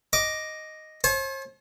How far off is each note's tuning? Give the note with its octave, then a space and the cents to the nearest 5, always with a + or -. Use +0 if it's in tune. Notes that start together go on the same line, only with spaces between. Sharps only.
D#5 +0 D6 +0
C5 +45 A5 -45